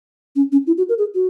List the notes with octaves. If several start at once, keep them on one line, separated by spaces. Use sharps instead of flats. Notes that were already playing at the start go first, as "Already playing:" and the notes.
C#4
C#4
E4
F#4
A#4
G#4
F#4